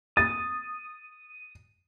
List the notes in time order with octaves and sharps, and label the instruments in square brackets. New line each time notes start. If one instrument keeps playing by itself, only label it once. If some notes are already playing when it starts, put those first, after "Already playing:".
[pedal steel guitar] D#6 [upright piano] A6